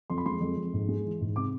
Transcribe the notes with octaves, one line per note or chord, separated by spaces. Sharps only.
F2 C6
B5
G#3 C6
F2
F2
G#2
G#3
E3
G#2
C3 D6